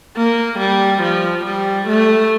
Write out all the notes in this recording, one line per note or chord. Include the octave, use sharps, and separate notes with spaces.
A#3
G3
F3
G3
A3